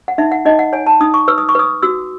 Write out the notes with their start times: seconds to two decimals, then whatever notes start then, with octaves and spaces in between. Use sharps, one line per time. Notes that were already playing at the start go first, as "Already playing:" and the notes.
0.08 F#5
0.18 D#4 E5
0.32 F#5
0.46 D#4 D#5
0.59 F#5
0.73 C#5 G#5
0.87 A5
1.01 D#4 D#6
1.14 C#6
1.28 B4 E6
1.38 D#6
1.49 C#6
1.55 B4 D#6
1.83 F#4 E6